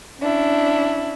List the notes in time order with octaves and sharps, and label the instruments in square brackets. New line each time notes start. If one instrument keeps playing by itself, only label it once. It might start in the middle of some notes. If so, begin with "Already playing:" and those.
[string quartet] C#4 D4 E4